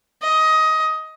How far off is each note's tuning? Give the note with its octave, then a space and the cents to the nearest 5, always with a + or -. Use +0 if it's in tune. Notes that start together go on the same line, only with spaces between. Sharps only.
D#5 +15